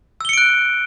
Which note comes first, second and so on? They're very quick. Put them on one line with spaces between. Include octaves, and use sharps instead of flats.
E6 G7 C#7 D7 F#6